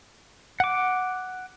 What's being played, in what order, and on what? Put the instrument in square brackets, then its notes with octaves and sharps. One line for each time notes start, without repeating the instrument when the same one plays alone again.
[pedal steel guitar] F#5 D6